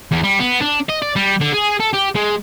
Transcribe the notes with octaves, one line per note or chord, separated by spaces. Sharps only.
E2
G3
B3
D4
D#5
D5
G3
D3
G#4
A4
G4
G#3